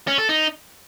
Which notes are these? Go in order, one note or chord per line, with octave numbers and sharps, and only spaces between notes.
C#4
A4
D#4